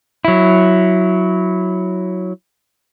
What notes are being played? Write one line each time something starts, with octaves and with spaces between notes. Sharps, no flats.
F#3 E4